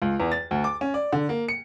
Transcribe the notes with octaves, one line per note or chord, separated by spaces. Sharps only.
C#2
E2
A6
D2
D6
C#4
D5
D3
A#3
C#7